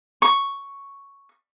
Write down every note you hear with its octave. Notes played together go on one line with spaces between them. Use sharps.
C#6